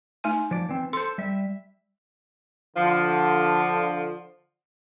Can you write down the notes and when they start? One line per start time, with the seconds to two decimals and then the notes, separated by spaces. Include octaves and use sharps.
0.24 A3 D#4 G#5
0.51 F3 D5
0.69 E3 C4
0.93 A4 C5 C6
1.18 G3 E5
2.76 D3 F3